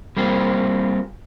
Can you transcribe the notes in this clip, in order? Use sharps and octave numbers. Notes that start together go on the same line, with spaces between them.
G3 A#3 C4 E4 F4 G#4